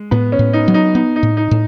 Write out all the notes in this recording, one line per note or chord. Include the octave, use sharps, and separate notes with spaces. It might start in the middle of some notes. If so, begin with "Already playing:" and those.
Already playing: G#3
A2 B3
C#4
A2
D#4
F#3
D#4
B3 D#4
D#4
A2
D#4
A2